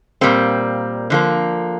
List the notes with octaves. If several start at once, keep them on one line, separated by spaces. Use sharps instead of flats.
A#2 G3 A#3 C4
D3 F3 A#3